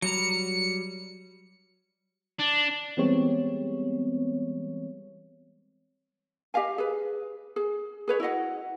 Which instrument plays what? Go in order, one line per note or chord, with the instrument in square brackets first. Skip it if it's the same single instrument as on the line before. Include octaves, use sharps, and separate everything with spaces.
[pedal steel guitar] F#3 G3 A#5 [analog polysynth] C#7
[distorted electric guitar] D4
[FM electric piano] E3 G3 G#3 B3 C4 C#5
[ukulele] G4 D#5 F5 G#5
G#4 B4
G#4
G#4 B4 C#5
E4 F#4 D#5 F#5